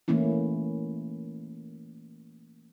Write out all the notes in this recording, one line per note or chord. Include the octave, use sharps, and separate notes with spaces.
E3 A3 A#3 C#4 E4